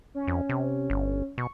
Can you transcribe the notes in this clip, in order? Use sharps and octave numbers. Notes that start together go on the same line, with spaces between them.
C#4
F2
C3
G1
B2 C#6